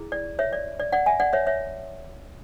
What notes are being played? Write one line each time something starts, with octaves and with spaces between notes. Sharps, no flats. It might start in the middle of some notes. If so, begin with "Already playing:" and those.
Already playing: E4 G#4
D5
C#5 E5
D5
D5
D5 F#5
E5 G#5
D5 F#5
C#5 E5
C#5 E5